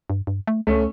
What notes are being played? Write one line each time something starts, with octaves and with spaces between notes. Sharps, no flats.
G2
G2
A3
C#2 A3 C#4